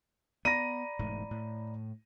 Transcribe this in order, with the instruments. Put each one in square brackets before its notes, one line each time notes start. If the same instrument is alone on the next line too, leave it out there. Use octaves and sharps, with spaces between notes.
[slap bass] B3 [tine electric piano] D5 A#5 B5 [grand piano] A#6 D#7
[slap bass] E1 G#2 A3
A2